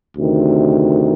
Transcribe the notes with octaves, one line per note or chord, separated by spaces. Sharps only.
D2 C3 D#3